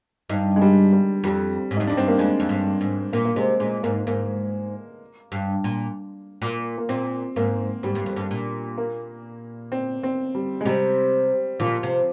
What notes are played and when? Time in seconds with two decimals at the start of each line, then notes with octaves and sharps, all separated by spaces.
0.29 G2 D#4
0.56 G#3
0.62 G3
0.93 G3
1.24 F2 G3
1.71 G#2
1.77 G2 D#4
1.87 F2 D4
1.97 G2 C4
2.08 A#3
2.18 F2 G#3
2.40 F2
2.49 G2
2.81 G#2
3.13 A#2 A#3
3.25 A#3
3.36 C3 G#3
3.60 A#2 G#3
3.83 G#2 A#3
4.07 G#2 A#3
5.32 G2
5.64 A#2
6.42 A#2
6.78 A#3
6.89 A#2 C4
7.36 G#2 A#3
7.83 G#2 G3
7.95 G2
8.06 F2
8.16 G2
8.31 A#2
8.78 A#3
9.72 C4
10.03 C4
10.35 G3
10.61 G#3
10.65 C3 G3
11.60 A#2 F3
11.83 C3